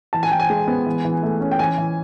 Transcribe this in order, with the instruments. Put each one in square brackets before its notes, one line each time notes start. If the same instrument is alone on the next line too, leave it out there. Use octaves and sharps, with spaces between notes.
[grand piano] E3 A5
G#5
E3 G5
G#5
G#3
B3
E3
E3
A3
C#4
G5
E3 G#5
E3